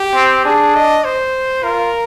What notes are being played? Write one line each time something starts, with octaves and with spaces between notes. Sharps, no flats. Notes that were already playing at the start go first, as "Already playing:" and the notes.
Already playing: G4
C4
D4 G#4
D#5
C5
F4 A#4